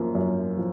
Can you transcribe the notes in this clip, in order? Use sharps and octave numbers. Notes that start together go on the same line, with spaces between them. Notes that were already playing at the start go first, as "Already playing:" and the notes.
Already playing: F#2 F3 A#3
F#2
F3